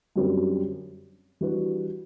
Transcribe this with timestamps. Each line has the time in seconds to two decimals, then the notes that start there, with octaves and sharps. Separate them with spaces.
0.16 F#2 D3 G3 C4 F#4
1.41 E3 G3 D4 F#4 B4